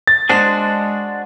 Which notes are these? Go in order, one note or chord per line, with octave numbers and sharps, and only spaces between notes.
A6
G#3 D4 F#4 G#4 C5 A5